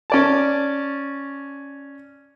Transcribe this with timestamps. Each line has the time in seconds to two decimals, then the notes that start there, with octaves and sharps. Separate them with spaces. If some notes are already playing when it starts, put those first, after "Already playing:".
0.10 C#4 D5 A5